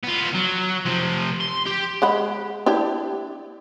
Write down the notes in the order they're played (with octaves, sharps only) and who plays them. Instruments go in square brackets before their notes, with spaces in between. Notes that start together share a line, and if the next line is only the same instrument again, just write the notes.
[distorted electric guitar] B3 F4
F#3
C3 F3
C6
G4
[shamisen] G#3 F#5 B5
D4 E4 G4